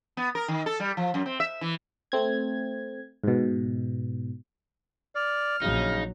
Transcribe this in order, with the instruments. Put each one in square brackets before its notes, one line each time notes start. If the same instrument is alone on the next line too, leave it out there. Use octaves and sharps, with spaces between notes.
[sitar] B3
A#4
D#3
A4
G3
F3
F#2
C4
E5
E3
[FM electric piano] A3 C4 G#6
G#2 B2
[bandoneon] D5 [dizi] F6
[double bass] A#1 F#3 [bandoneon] C#3 [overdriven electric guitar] D#4